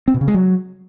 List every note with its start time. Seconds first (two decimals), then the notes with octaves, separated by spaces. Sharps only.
0.08 C4
0.14 B2
0.21 C#3
0.28 G#3
0.34 F#3